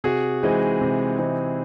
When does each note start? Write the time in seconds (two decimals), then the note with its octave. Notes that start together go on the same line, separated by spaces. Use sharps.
0.04 C3 F#4 G#4
0.43 E3 G#3 C4 D#4
0.81 C3
1.19 E3 G#3 C4 D#4